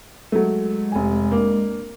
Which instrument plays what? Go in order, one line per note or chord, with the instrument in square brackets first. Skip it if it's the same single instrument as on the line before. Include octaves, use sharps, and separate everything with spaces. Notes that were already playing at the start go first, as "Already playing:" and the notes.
[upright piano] F#3 A3 [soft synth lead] G#3
[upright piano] F1 G#5
A#3 D4